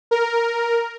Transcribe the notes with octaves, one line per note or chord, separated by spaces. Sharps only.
A#4